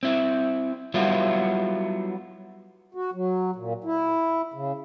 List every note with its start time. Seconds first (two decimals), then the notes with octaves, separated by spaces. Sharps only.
0.03 C4 E4
0.94 F#3 G3 B3 E4 F4
2.95 F#4
3.14 F#3
3.56 A#2
3.84 E4
4.54 C#3